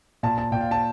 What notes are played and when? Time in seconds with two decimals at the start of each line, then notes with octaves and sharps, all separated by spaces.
0.23 A#2 A5
0.38 A5
0.52 A#2 G5
0.61 F5
0.71 A5